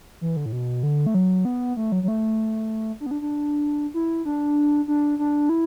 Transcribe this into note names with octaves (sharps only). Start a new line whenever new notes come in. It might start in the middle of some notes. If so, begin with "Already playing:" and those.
E3
D3
A2
B2
D3
A3
F#3
B3
A3
F#3
F#3
A3
D4
B3
D4
D4
E4
D4
D4
D4
E4